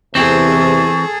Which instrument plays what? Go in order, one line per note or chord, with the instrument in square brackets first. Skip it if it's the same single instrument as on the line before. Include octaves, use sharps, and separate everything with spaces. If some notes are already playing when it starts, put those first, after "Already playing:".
[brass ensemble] E2 C3 [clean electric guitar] E3 C4 [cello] G#4 A4 [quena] C#6